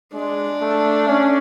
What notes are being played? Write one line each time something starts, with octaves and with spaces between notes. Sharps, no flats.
G#3 D4
A3
C#4